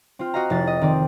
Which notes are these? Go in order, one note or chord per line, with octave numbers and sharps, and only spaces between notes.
C4 F4
F#4 D#5 F5 A#5
F1 E4 A6
D#5
D#3 C4 D5